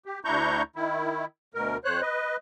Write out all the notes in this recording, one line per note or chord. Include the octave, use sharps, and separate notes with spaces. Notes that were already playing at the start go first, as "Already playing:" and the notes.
G4
D2 D4 E4 A#5 C#6 G6
D#3 E4
D2 B2 A#4
F2 C5 C#5 F#6
B4 D#5